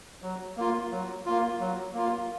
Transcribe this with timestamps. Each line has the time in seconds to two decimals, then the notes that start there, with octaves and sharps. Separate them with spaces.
0.22 F#3
0.57 A#3 F4
0.91 F#3
1.26 A#3 F4
1.60 F#3
1.93 A#3 F4